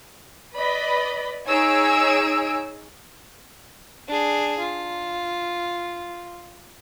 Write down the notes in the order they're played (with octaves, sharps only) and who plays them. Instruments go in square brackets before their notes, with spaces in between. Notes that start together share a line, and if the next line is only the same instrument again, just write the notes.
[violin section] B4 D5 D#5 B5
D#4 G#4 C#5 G#5 E6 D7
[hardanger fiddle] D4 G#4
F4